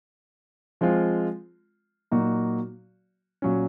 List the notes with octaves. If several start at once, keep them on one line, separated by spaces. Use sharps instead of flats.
F3 G#3 C4 F4
A#2 F#3 A#3 D#4 F#4
A#2 F#3 C#4